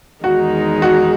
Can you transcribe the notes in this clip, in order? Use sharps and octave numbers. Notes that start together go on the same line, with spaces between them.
E2 D#3 G#3 D#4 F#4
F#4